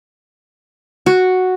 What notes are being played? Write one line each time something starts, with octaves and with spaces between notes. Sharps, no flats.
F#4